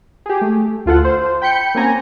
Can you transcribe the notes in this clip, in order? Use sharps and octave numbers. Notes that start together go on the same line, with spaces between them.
G4 G#4
A3
D2 F4 A4 F#5
C5
G5 B5 G6 C#7
A#3 C4 C#4 F#4 G#5 A#5